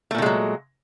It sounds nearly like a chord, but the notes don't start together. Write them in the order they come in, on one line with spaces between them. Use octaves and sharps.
A3 A#2 D#3 G#3 F#3